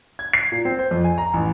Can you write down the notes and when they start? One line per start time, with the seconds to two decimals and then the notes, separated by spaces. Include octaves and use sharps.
0.19 G#6
0.33 C7
0.52 A#2
0.65 C4
0.79 C5
0.91 F2
1.04 G#5
1.18 A#5
1.34 A1